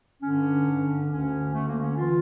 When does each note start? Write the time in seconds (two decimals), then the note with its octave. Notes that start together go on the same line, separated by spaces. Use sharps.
0.23 G2 D3 C#4
0.66 G2 D3
1.10 D2 D3 C#4
1.54 D2 D3 A3
1.69 A#3
1.83 C#4
1.98 E3 F4